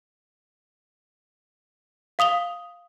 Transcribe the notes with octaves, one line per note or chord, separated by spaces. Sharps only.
F5 D#6 F7 G7